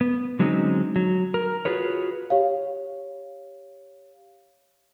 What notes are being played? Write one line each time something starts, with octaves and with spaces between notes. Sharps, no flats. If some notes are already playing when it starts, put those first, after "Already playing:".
B3
D3 F#3 G#3 C4 C#4 D#4
F#3
A#4
F4 F#4 G#4 B4 C#5
G4 C#5 F5